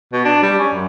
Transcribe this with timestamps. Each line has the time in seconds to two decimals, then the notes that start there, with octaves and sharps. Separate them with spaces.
0.13 B2
0.25 D4
0.42 G3
0.58 C#4
0.72 F#2